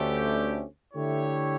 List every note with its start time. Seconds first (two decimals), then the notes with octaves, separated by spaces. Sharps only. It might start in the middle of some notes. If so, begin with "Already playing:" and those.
Already playing: D2 D3 A3 C#4 G4
0.93 D3 A3 E4 G4 C#5